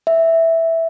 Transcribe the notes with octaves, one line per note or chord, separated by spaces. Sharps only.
E5